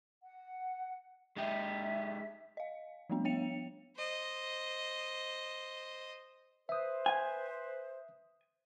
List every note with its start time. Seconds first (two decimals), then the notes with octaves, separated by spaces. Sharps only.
0.23 F#5
1.36 G#3 D#4 G4 E5
2.57 D#5 F5
3.09 F3 G3 A3 B3 D4
3.25 B3 C#5 G5 C#7 F7
3.96 C5 D#5
6.69 B4 C5 E5 D#6
7.06 G#5